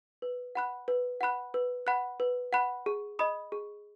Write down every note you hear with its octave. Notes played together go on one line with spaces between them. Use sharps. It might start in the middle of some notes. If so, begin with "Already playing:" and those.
B4
F#5 B5 F#6
B4
F#5 B5 F#6
B4
F#5 B5 F#6
B4
F#5 B5 F#6
G#4
D#5 B5 D#6
G#4